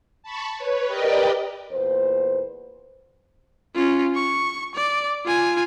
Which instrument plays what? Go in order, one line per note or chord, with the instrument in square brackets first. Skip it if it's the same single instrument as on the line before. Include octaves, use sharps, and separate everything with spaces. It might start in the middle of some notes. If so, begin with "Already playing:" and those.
[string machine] A5 B5 C#6
B4 C#5
G4 A#4 B4 D5 D#5 G5
[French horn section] E2 A#2 B4 C5
[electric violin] C#4 F4
C#6
D5
F4 G#5